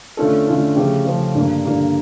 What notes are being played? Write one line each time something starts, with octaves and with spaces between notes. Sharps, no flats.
D3 A3 C#4 F4 A4
D3 A3 C#4 F4 A4
C#3 F3 A3 C#4 G4
C#3 F3 A3 C#4 G4
G2 D3 G3 A#3
G2 D3 G3 A#3